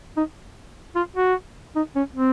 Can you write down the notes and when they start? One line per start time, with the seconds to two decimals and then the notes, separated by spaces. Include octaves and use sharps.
0.17 D#4
0.96 F4
1.16 F#4
1.76 D#4
1.96 C#4
2.15 C4